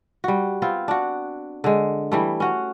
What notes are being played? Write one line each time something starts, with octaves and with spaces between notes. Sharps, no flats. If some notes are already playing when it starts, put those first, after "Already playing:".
G3 F#4
B3 C4 F4
D4 F#4
D3 G#3
E3 G3 A3
C#4 F#4